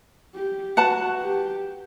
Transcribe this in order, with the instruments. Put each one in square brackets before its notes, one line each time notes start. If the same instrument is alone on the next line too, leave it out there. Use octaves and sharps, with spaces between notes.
[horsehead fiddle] G4
[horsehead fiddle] F#4 [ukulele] B4 F#5 A5
[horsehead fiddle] G4